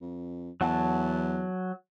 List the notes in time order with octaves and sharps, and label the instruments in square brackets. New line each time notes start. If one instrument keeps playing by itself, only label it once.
[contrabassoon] F2
[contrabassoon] E2 [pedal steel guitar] F#3 F#5 A5